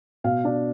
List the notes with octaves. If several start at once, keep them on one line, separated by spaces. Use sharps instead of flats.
B2 F5
D4